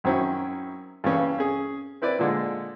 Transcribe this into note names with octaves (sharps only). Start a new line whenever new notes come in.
F#2 D#3 F#3 C4 C#4 E4
G2 C#3 E3 C#4
C#4 G#4
C4 E4 B4 D5
A#2 D3 G#3